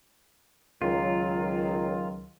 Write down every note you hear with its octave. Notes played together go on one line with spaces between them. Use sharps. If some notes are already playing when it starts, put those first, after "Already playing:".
C#2 D#3 F#3 F4